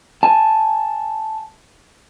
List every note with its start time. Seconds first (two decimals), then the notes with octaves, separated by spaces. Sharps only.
0.23 G#5 A5